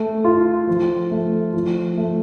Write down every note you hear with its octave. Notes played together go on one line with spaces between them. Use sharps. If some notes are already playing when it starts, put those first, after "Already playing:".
Already playing: A3
F4
F3
A3
F3
A3